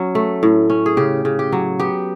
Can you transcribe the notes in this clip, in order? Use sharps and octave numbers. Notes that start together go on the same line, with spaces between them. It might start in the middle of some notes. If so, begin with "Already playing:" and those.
Already playing: F#3 C#4
A3
A2
C#4
G#4
C#3 G4
C#3
G4
F#3
B3 G4